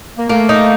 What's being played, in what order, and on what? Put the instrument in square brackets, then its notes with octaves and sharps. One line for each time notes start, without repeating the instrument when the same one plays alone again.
[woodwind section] A#3
[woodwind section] A3 [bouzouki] A#3
[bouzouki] D#4